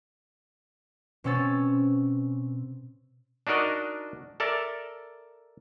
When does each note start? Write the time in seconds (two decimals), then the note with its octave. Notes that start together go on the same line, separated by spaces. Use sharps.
1.24 B2 C4 C#4 E6 A6
3.47 D4 D#4 F#4 A#4 D5 D#5
4.40 A4 A#4 D5 E5